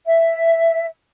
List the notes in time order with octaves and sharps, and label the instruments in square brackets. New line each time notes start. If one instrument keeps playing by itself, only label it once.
[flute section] E5